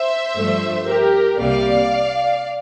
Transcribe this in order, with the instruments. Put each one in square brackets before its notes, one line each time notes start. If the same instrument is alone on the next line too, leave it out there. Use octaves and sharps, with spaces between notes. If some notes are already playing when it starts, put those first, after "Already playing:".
Already playing: [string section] C5 E5
G2 F3 A3
G4 A#4
C2 C3 G3 A#3 D5 F5